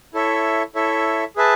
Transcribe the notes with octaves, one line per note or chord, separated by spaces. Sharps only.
E4 A4 C#5 E5
E4 A4 C#5 E5
G#4 B4 E5 A5